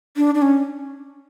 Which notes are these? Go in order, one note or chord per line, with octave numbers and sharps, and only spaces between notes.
D4
D4
C#4